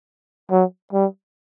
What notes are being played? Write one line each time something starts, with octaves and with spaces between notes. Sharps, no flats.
F#3
G3